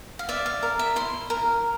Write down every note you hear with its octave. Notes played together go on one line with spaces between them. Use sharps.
F5
D5 E5
F5
A#4
E5
E4 C6
A#4